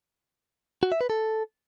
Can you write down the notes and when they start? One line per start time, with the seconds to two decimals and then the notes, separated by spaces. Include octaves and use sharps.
0.83 F#4
0.92 E5
1.01 B4
1.10 A4